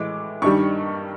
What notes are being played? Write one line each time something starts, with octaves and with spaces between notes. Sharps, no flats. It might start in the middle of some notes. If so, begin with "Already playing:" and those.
Already playing: A2 E3 G#3 D6
G2 D#3 G3 C#6